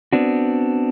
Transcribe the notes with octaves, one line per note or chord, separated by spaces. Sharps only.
B3 C4 D4 F#4